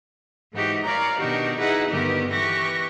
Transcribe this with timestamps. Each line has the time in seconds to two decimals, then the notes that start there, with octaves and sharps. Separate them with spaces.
0.53 G#2 E3 D#4 F#4 G4
0.83 A#4 C#5 D5 F5 A#5
1.17 B2 D#3 D4 D#4 F#4 G4
1.57 D#4 E4 G#4 B4 D#5 F#5
1.90 G2 D3 D#3 B3 G4 A#4
2.28 E3 G4 B4 C#6 A#6